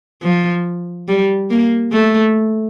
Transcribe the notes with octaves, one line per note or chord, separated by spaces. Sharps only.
F3
G3
A#3
A3